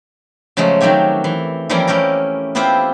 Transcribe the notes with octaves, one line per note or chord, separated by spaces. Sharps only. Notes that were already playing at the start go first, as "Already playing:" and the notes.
C#3 F3 F#3 G#3 A3
D#3 F#3 C4 G4 C#5
E3
E3 F3 G3 A#3 C#4 E4
A3 C#4 G4 A#4
B3 C4 E4 F4 G4 C5